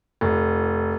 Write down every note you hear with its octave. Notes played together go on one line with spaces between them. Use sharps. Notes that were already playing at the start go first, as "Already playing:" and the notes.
F1